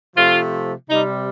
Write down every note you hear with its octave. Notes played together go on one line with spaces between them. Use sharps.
C3 F3 A3 F4
C3 G3 D#4